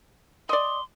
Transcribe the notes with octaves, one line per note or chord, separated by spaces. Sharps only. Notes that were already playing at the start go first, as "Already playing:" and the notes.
D5 D#5 C6